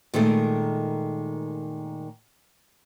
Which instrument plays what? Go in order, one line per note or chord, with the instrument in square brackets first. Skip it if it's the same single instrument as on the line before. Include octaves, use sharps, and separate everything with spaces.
[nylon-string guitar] A#2 D#3 G#3 A3